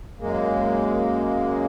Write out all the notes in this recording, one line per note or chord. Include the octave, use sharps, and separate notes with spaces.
F#2 G#3 A#3